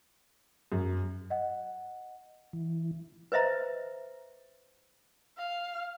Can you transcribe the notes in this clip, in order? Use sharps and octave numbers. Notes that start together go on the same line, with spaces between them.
F#2
D#5 F#5
E3
B4 C5 D#5 E5 A#5
F5